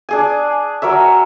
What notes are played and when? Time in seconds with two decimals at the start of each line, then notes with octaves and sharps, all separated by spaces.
0.09 D4 G#4 G#5
0.82 F#3 A#4 C#5 E5